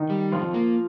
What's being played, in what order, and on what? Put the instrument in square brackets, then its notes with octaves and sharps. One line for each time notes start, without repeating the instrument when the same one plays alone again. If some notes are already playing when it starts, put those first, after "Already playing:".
Already playing: [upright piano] D#3 D#4
[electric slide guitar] G3
[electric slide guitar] F2 [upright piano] F3 F4
[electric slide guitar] A#3